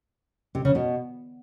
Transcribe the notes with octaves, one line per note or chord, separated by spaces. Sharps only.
C3
C#3
B2